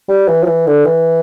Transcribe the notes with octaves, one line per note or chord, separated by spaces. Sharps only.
G3
E3
F#3
E3
D3
E3